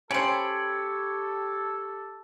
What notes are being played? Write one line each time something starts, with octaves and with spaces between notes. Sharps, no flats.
C#4 G4 A4 C5 C#5 G5 B5